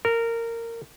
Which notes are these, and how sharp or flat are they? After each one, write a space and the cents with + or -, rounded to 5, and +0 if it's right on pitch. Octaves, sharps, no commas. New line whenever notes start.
A#4 -15